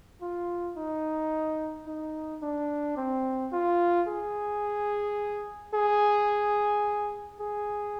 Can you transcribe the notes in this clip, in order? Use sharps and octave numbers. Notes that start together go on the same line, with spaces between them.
F4
D#4
D#4
D4
C4
F4
G#4
G#4
G#4